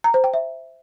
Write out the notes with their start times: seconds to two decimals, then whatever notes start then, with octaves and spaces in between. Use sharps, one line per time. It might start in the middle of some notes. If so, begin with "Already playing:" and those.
0.04 A#5
0.14 C5
0.24 G5
0.34 E5